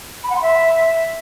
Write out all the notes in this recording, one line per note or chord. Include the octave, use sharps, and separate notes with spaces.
B5
F#5
C6
E5